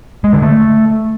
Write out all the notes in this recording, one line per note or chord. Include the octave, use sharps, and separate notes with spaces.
G#3
D3
A3